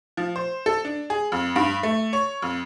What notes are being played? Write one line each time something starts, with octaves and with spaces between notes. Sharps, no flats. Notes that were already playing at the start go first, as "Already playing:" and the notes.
F3
C5
A4
D4
G#4
F2
G2
A3
C#5
F2